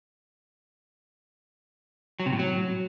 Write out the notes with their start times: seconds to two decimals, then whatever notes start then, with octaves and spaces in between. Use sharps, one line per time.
2.20 F#3
2.26 C3
2.33 A2
2.39 F#3